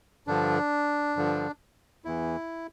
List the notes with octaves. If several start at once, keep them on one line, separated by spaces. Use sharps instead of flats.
G2 D3 F3 D4
G2 D3 F3
E2 E3 E4